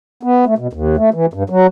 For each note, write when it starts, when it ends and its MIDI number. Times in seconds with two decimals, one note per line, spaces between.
0.23 0.45 59
0.46 0.54 57
0.58 0.67 47
0.73 0.96 39
0.97 1.10 57
1.14 1.26 52
1.34 1.43 43
1.50 1.67 54